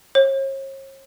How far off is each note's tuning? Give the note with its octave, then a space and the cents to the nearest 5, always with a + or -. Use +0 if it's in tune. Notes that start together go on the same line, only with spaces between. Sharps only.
C#5 -40